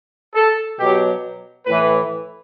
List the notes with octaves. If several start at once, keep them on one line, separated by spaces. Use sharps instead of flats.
A4
B2 F#3 G4
A2 E3 B4